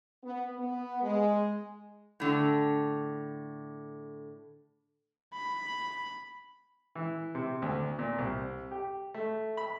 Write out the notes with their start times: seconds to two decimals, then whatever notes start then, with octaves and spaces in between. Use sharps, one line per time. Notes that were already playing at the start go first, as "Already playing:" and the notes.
0.23 B3
0.59 B3
1.02 G#3
2.20 A2 D3
5.33 B5
6.95 E3
7.35 C3
7.62 D2
7.99 A#2
8.18 C2
8.71 G4
9.14 A3
9.57 B5